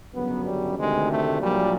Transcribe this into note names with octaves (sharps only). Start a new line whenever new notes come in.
G1 F#2 C#3 F#3 B3
G3
D2 C3 D#3 G#3
A3
A#1 A#2 F#3 G3